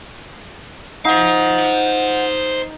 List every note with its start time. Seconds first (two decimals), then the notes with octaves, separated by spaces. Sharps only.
1.05 D#4 C5 F5 F#5